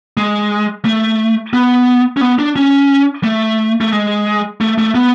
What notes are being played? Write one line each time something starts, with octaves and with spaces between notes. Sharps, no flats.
G#3
A3
B3
C#4
B3
D4
C#4
A3
A3
G#3
A3
A3
B3